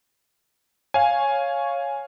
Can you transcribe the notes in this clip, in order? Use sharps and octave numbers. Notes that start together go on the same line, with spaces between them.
C#5 F5 G#5